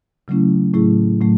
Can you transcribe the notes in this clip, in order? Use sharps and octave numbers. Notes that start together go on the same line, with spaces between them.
C#3 F#3 A3 C#4 E4
A2 F#3 A3 E4 G#4
A2 F#3 A3